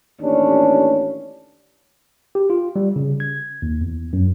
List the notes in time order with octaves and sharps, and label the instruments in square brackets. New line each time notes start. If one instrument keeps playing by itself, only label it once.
[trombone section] A1 D#2 C#4 D4
[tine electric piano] G4
F4
G3
C#3
G#6
D#2
E2
F#2